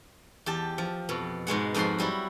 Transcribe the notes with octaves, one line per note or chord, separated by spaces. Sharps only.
E2 G4 A5
F3
F2 B2
G#2 B2 G#3 F#5
F2 G#2 F3 F#4 C6
F#3 G3 E4 F#4